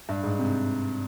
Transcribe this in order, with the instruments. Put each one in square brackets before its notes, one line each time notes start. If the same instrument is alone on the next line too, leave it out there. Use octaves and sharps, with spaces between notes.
[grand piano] G2
G#2
C3